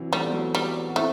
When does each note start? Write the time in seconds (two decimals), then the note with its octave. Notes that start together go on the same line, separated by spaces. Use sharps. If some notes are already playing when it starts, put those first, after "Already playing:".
Already playing: C3 E3 F#3
0.12 G3 A3
0.23 B3
0.33 F#3 A3
0.55 G3
0.89 F#4
0.96 A3 C4 E4